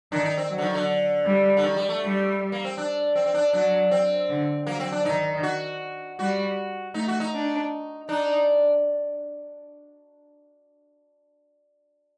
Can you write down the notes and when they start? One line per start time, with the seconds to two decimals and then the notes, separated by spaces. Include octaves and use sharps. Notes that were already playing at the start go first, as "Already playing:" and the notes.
0.12 D#3 D4
0.24 D#4
0.38 C4
0.49 F#3
0.58 D3
0.62 D#3
0.75 D3
1.26 G3
1.57 D3
1.64 D#3
1.76 G3
1.89 A3
2.02 G3
2.52 A#3
2.65 C4
2.78 D4
3.16 C4
3.26 C4
3.34 D4
3.53 F#3 D4
3.91 C4
4.29 D3
4.67 F#3 A#3
4.80 C4
4.92 D4
5.05 D#3 D#4
5.43 F#4
6.19 G3 F#4
6.94 A3 D#4
7.08 F#4
7.20 D#4
7.33 D4
8.08 D4 D#4